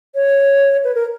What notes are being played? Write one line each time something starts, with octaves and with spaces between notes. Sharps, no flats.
C#5
B4
A#4